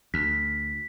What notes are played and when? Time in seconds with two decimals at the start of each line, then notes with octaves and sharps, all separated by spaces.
0.14 D2 B6